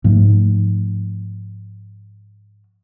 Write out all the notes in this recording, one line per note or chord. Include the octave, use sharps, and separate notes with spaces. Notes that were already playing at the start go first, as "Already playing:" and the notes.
G#2 F3 A3